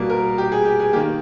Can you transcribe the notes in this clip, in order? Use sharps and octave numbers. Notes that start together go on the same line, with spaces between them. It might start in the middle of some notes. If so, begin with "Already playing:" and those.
Already playing: B2 G3 A#3
A#4
G4
G#4
G4
G#4
D#3 A#3 G4